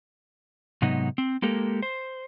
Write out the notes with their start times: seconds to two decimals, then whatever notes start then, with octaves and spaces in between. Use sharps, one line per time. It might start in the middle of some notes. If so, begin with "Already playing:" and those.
0.82 G#2 C3 F#3 B3 D#4
1.18 C4
1.42 G#3 A#3 G4 A4 A#4
1.82 C5